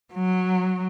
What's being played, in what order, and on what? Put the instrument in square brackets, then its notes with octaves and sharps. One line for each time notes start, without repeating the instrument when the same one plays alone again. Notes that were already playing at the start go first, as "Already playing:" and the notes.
[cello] F#3